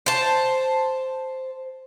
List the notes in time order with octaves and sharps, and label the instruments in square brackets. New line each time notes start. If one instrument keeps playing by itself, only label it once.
[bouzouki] C5 A5